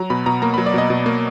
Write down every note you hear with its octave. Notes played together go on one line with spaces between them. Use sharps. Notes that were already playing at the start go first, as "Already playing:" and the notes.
Already playing: F#3 A#5
B2 B5
B2 A#5
A#3 A#5
B5
F#3
D5
B2 D#5
B2
A#3